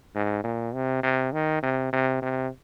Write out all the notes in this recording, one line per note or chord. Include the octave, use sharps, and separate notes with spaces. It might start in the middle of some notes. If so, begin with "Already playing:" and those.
G#2
A#2
C3
C3
D#3
C3
C3
C3